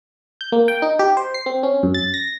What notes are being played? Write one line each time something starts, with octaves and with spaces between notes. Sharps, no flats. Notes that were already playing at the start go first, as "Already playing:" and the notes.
G6
A#3
G5
D#4
G4
C5
C7
C4
C#4
F#2
A6
A#6